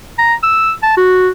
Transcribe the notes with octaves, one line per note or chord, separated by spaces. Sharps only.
A#5
E6
A5
F#4